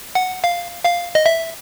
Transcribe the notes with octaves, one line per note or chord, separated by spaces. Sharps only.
F#5
F5
F5
D#5
E5